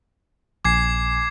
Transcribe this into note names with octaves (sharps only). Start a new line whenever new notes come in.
A#1 G#5 D6 G#6 C7